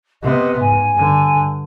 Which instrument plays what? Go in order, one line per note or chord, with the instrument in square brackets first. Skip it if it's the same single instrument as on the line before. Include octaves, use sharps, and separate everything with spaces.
[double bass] C3 B3 [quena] D#5
[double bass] G#2 [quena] G#5
[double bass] G2 D3